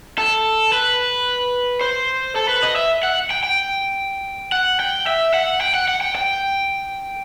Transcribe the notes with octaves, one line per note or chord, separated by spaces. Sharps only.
A4
B4
C5
A4
B4
D#5
E5
F#5
G5
G5
F#5
G5
E5
F#5
G5
F#5
F#5
G5
G5